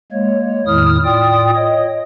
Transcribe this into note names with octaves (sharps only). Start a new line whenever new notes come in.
G#3 A#3 C#5
E2 A2 D#3 E4 D#6 F6
A2 F4 D5 G5 D#6
C#5 D#5